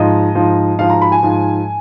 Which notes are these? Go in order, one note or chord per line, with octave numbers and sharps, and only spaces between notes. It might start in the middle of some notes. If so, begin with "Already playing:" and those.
Already playing: G#2 F3 D#5
G#2 F3
G#2 F3 F5
A#5
B5
G#5
G#2 F3